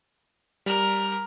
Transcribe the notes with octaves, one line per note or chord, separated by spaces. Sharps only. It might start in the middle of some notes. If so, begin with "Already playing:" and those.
G3 A#4 F6